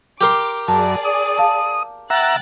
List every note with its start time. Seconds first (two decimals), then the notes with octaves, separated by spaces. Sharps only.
0.21 G4 A#4 C6 D6
0.68 F#2 G#4 D5 A5
1.05 D#6
1.38 F5 A5
2.10 E5 F#5 G5 A#5 F#6 A6